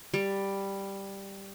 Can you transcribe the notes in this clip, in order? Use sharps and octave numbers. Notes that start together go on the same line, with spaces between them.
G3